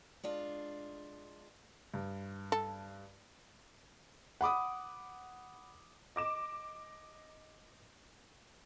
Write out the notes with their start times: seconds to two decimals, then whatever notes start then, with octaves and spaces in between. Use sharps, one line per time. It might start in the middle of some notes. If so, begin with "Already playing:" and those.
0.23 G#3 D4 F4
1.94 G2
2.52 A4
4.41 F#5 B5 D6 D#6
6.16 D#5 D6 E7